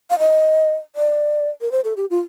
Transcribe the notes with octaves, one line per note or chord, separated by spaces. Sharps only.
F5
D#5
D5
A#4
C5
A4
G4
F4